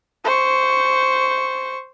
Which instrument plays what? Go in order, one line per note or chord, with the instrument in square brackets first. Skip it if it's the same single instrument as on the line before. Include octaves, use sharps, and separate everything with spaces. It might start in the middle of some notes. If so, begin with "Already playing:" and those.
[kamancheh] C5 C#6